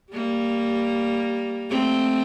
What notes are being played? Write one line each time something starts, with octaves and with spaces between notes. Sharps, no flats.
G3 A#3
A3 C4